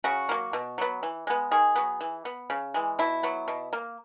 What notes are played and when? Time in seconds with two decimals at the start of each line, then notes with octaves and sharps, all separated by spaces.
0.04 C#3 F#4
0.29 F#3 A#3
0.53 B2
0.78 F#3 B3
1.03 E3
1.27 G#3 B3
1.51 D#3 G#4
1.76 F#3 B3
2.01 E3
2.25 B3
2.50 C#3
2.74 E3 G#3
2.99 B2 E4
3.23 F#3 B3
3.48 B2
3.73 A#3